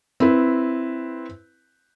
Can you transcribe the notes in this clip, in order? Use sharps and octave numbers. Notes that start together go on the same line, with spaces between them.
C4 E4 B4